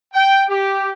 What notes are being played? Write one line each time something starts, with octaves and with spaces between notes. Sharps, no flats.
G5
G4